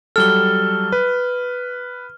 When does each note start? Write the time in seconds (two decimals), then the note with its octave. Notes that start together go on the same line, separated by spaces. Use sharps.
0.16 F#3 G3 A4 F6 G7
0.92 B4